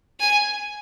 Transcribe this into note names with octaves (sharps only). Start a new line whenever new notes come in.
G#5